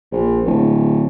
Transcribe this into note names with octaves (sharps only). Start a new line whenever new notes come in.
A#1
D1